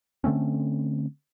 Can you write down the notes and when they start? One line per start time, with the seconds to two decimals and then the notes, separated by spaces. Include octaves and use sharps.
0.24 D3 A3 C4 C#4